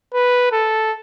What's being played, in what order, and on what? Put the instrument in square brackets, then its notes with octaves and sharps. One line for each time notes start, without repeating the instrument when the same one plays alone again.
[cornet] B4
A4